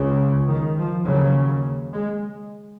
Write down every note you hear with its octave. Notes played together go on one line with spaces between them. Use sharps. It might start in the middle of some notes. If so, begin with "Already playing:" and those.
Already playing: C#2 C#3
D#3
F3
D#2 C#3 F#3
G#3